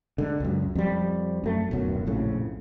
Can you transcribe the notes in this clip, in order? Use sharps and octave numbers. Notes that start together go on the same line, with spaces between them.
D3 G#3
C#2 F#2
F2 G3
F#2 A3
D1 B1 F#2 F#3
A#1 F2 A2 C#3